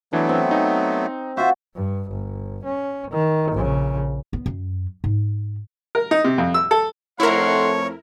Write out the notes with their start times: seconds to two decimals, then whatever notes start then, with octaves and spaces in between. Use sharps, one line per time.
0.13 E3 F#3 A3 B3 D4
0.29 C4
0.51 D#4
1.37 F4 F#4 C5 E5
1.75 G2
2.12 G1
2.65 C#4
3.11 D#3
3.52 A#1 C#3
4.33 B3
4.46 F#2
5.04 G#2
5.95 A#4
6.11 D#4
6.24 C3
6.38 F2
6.54 E6
6.71 A4
7.20 F2 A3 E4 A#4 C#5 F#5 C6